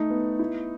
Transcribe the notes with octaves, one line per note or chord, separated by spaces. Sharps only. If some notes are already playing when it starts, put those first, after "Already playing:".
Already playing: A3 D#4
B3
E4